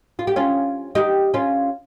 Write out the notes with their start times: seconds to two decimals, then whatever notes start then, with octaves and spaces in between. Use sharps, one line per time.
0.19 F4
0.27 G4
0.36 C#4 F4
0.95 D#4 G4
1.34 C#4 F4